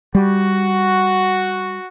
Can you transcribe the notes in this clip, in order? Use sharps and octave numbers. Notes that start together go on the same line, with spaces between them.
G3 F#4